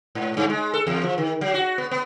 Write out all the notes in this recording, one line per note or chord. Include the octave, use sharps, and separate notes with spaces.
G#2
G2
G#3
A4
E2
F3
D#3
F#3
F#4
B3
B3